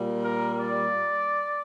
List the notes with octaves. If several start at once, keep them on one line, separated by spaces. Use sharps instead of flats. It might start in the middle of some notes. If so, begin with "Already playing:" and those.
Already playing: A#2 G3
A#4
D5